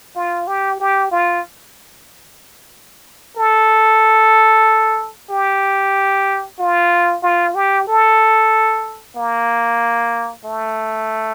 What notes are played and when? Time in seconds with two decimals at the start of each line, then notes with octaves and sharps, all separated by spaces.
0.16 F4
0.47 G4
0.80 G4
1.11 F4
3.37 A4
5.30 G4
6.59 F4
7.23 F4
7.55 G4
7.87 A4
9.16 A#3
10.45 A3